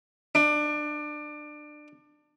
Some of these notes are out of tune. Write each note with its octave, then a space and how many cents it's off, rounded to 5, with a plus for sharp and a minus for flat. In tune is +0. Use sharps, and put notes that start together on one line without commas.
D4 +25